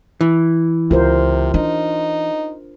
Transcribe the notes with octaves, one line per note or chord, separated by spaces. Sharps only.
E3
C#2 C3 F4 A#4 C5
D4 D#4